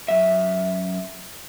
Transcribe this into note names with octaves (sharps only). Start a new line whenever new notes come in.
F#2 E5